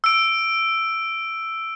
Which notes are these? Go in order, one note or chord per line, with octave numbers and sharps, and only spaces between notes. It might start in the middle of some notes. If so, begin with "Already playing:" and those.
E6 D7